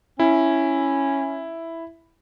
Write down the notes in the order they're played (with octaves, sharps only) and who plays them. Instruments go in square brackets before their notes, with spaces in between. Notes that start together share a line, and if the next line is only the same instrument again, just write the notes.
[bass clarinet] C#4 [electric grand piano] E4